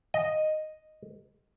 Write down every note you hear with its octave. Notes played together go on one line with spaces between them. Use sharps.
D#5